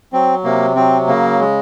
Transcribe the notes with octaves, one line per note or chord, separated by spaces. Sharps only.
F#3 C4
C3 A#3
F#3 C4
C#3 A#3
G#3